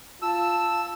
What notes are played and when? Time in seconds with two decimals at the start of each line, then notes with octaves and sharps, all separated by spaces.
0.22 F4 A5 E6